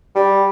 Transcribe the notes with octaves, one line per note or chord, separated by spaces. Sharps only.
G3